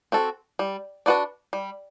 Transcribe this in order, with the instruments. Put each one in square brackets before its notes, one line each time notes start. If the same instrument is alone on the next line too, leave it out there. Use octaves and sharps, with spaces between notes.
[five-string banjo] C4 F#4 A4
G3
D4 F#4 B4 D5
G3